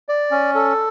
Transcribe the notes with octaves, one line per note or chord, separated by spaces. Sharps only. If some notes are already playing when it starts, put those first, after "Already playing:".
D5
C#4
A4